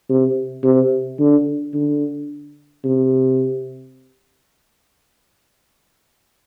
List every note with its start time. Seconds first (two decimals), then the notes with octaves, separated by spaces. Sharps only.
0.09 C3
0.64 C3
1.19 D3
1.74 D3
2.85 C3